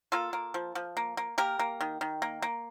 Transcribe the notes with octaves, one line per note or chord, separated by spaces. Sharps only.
A#3 F4 A4
A#3
F3
F3
A#3
A#3
A#3 G4 A#4
A#3
D#3
D#3
A#3
A#3